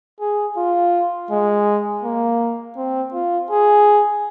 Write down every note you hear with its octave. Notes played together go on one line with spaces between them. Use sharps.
G#4
F4
G#3
A#3
C4
F4
G#4